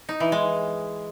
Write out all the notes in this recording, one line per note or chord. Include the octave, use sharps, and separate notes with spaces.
D#4
E3
G#3